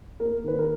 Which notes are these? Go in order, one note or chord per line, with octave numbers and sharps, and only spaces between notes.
A#3 A#4
D#3 B4
A#4